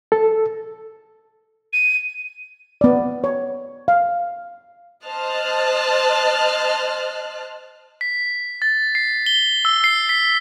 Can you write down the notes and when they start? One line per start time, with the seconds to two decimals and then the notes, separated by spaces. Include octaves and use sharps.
0.12 A4
1.73 D#7
2.81 B3 D5
3.24 C#5
3.88 F5
5.05 C5 D#5 A5 F6 F#6
8.01 B6
8.62 A6
8.95 C7
9.26 G7
9.65 E6
9.84 C7
10.09 B6